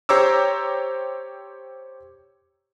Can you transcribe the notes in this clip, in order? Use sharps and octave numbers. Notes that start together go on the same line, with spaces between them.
G4 C5 C#5 A#5 D6 E6